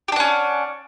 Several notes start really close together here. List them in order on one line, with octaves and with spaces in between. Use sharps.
G4 D4 F#5 C#4